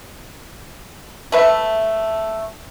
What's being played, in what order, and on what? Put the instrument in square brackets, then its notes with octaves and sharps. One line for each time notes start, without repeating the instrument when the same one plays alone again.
[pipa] A3 B4 E5